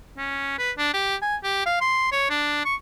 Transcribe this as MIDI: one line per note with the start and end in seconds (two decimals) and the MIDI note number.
0.17 0.56 61
0.59 0.71 71
0.78 0.90 62
0.94 1.16 67
1.22 1.36 80
1.44 1.62 67
1.66 1.78 77
1.81 2.10 84
2.12 2.29 73
2.30 2.60 62
2.65 2.75 85